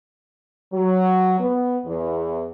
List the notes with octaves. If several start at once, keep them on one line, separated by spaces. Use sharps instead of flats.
F#3
B3
E2